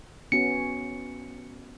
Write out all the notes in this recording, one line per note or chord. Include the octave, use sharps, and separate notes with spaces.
B3 C#4 F#4 C#7